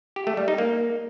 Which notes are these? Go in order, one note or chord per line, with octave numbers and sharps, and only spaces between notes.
G4
A3
G3
D#4
A#3